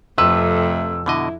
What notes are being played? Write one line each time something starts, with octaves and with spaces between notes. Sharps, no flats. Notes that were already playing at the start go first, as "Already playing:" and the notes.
F2 C3 A3 B4 E6
B2 D3 E4 D#5